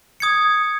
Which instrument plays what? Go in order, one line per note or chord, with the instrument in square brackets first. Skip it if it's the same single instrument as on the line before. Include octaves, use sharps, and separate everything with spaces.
[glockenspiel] D#6 G#6 C#7